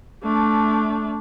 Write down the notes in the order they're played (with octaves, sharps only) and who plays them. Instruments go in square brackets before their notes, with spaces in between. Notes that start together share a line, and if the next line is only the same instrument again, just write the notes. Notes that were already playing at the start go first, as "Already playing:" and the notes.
[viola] A3 D4